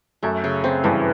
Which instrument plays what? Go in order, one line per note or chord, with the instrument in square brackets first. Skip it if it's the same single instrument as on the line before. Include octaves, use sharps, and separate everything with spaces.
[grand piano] F#2 [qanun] A3
[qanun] C#3
C4
[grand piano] G2 [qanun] E3